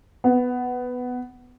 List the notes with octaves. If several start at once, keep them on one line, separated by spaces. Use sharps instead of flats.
B3